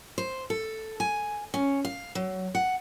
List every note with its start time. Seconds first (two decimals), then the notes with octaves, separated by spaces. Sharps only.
0.18 C5
0.50 A4
1.00 G#5
1.54 C#4
1.85 F5
2.15 F#3
2.55 F#5